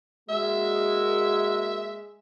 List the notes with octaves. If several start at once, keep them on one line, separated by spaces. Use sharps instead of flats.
G#3 A#3 F#4 E5